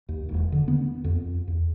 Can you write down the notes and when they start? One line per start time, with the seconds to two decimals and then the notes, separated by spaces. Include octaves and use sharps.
0.09 D#2
0.29 E1
0.52 D3
0.68 B3
1.04 F2
1.48 E2